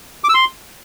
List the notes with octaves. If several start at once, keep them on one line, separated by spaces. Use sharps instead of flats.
D6
E6
C6